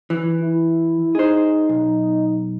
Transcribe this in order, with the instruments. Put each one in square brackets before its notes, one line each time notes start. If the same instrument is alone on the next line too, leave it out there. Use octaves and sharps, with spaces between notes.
[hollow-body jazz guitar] E3
[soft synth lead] E4
[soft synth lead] D#4 [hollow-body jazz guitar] G#4 C5
[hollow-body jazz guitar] B1